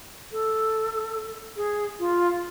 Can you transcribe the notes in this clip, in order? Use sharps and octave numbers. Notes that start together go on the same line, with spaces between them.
A4
G#4
F4